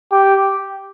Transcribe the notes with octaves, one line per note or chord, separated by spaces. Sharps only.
G4